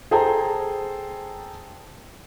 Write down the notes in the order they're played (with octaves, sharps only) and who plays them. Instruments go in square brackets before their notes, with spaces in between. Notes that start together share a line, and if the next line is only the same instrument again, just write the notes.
[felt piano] G#4 A4 C5 G5 A5 A#5